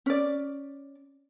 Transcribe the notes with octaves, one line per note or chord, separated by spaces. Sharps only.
C#4 D5